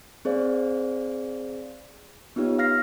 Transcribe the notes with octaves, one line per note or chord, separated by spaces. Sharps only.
C4 G#4 C5 D5 F5
B3 D#4 F4 G4 C#5
F5 F6 A#6 C7